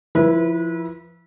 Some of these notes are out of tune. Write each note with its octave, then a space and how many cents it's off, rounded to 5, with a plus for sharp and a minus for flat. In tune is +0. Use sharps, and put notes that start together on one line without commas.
F3 -15 E4 +0 B4 -35